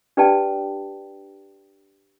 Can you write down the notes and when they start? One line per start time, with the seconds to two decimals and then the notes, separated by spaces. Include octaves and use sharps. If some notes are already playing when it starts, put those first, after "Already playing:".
0.17 D4 G4 B4 D5 G5 A5